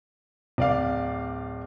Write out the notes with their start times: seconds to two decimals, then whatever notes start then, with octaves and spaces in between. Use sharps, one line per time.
0.58 D1 D5 F5